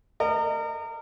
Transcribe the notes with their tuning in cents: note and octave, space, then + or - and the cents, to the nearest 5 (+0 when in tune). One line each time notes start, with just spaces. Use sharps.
A#4 -30 D#5 -40